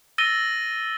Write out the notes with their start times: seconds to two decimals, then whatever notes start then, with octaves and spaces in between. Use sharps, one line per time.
0.18 E6 A6 A#6 D#7 G7